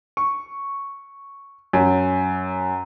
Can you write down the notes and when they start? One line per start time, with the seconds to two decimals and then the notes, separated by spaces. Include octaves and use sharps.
0.17 C#6
1.73 F#2